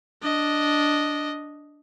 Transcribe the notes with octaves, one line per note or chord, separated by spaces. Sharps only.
D4 D#5